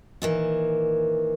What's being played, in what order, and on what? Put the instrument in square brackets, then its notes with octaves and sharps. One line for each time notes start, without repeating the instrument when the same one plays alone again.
[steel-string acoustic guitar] A#2 D#3 E3